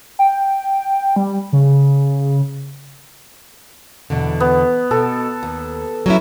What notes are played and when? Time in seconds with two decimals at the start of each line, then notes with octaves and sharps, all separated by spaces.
0.19 G5
1.16 G3
1.53 C#3
4.10 E2 B2 D3
4.40 B3
4.91 B2 A4
5.43 D#2
6.06 F#3 C#4 E4